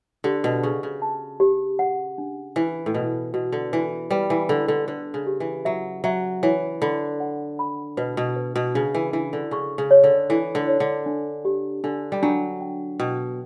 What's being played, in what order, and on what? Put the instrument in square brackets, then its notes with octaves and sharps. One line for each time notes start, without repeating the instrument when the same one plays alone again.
[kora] D3 [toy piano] G4
[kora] B2
[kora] C#3 [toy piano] C#6
[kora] C#3
[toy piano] A5
G4
F#5
D4
[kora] E3 [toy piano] B4
[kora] A2
[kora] B2 [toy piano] B4
[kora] B2 [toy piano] F#4
[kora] D3
[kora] E3 [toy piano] B4
[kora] G3 [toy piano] B4
[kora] E3
[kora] D3 [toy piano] D4
[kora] D3
[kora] D3 [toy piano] B4
[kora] C#3
[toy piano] G4
[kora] E3
[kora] F#3 [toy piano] E5
[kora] F#3 [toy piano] E5
[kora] E3 [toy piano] C#5
[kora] D3 [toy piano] B5
[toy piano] F#5
B5
[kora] B2 [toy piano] B4
[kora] B2
[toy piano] B4
[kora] B2
[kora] C#3 [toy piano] D4
[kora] E3
[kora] E3 [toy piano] D4
[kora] D3
[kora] C#3 [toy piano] C#6
[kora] C#3
[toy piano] C#5
[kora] D3
[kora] E3 [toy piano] A4
[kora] D3
[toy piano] C#5
[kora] D3
[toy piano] D4
G4
[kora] D3 [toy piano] D4
[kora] G3
[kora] F#3 [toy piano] D4
[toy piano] G5
[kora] B2 [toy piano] G5